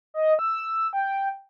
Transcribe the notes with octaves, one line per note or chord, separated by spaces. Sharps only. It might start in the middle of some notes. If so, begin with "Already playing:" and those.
D#5
E6
G5